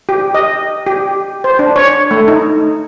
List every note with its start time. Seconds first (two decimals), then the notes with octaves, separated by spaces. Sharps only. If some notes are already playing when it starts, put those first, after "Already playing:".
0.09 G4
0.35 D#5
0.87 G4
1.44 C5
1.59 D4
1.76 C#5
2.11 A3
2.28 D#4